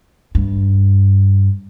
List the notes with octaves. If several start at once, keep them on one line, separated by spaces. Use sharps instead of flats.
G2